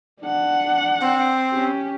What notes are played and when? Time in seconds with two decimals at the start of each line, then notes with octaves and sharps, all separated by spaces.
0.22 D4 F#5
1.01 C4
1.53 C#4 G4